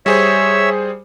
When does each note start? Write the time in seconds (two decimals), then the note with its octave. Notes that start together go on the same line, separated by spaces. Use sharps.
0.06 G3 G#4 C5 C#5 E5 E6